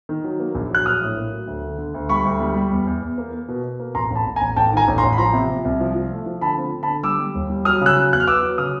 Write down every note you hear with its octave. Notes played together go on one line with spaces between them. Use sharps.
D#3
F#3
A#3
A#1
F#3 F#6
A#1 D#6 F6
A2
A#3
F#3
D2
D3
D3
D2
G3 B5 C#6
D2
G3
G3
E2
E2
E2
A#3
A#3
B2
B2
A#3
A1 A#5 C6
A1
A5 B5
A1
G#5 A#5
A1
A1 G5 A5
D#3
G#5 A#5
A1
A#5 C6
A1
B5
F3 A#5 C6
C3
C3
C2
F3
F3
A3
F3
D3 A5 B5
C4
D3
A5 B5
D3
G3 D6 E6
G3
D#2
G3
F#3 D#6 F6
C#3 E6 F#6
F#3
E2 F#6
F6
B3 D6 E6
F#3
C#3 D#6 F6